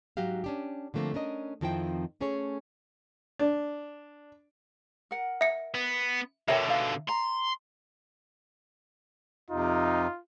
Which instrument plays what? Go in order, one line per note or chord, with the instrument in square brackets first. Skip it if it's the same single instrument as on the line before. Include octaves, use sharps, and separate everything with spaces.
[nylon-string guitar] G#2 F#3 F#4 G4 F5
C#4 D4 G4
D3 F3 A3 A#3 C4
C#4 D4 A#4 D#5
F2 D#3 F3 C4 E4 G5
A3 C#4 G#4 A4 C#5
[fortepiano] D4
[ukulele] A#4 F#5
[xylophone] E5 C#7
[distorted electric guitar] B3
[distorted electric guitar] B2 D3 [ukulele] A#4 C#5 G5 [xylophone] E5
[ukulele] D#4 F5
[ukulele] A#5 [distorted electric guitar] C6
[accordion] F2 C3 [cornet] D#4 [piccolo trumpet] F4